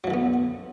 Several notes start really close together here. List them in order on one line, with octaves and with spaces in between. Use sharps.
F#3 E3 D3 B3